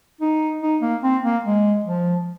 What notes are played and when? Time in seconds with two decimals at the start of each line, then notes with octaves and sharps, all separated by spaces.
0.21 D#4
0.62 D#4
0.82 A#3
1.03 C4
1.24 A#3
1.45 G#3
1.86 F3